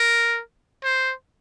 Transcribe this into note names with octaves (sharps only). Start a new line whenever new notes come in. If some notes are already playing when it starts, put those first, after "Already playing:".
Already playing: A#4
C5